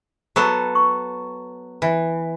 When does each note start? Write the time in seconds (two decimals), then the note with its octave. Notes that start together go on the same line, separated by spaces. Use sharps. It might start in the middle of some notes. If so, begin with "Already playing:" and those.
0.36 F#3 B3 A4 C#6
0.75 C#6
1.82 E3